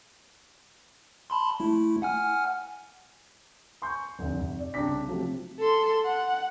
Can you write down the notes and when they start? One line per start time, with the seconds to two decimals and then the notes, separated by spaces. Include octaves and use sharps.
1.30 A5 B5 C6
1.60 A3 E4
2.02 F#5 G#5 F6
3.82 G#5 C6 C#6 G6
4.19 F1 D2
4.39 F1
4.59 D5
4.74 C2 C#3 D4 D6 B6
5.08 C3 F3 F#3 A3 C4
5.60 A4 C6
6.05 F#5